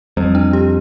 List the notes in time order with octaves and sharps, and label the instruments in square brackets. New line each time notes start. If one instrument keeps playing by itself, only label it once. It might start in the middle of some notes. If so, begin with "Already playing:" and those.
[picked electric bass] F2 [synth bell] G3
[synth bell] D4
G4